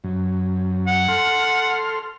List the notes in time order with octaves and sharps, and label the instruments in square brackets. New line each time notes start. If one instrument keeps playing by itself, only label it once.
[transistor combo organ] F#2
[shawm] F#5
[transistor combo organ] A4 C6 F6